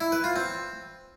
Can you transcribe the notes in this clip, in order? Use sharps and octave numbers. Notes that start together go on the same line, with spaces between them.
E4
B4
F4
C4